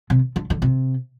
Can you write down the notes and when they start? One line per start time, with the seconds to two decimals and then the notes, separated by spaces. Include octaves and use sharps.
0.10 C3
0.36 D3
0.50 D3
0.62 C3